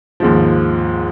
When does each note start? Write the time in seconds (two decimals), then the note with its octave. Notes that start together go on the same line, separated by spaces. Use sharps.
0.20 D#2 G#2 F3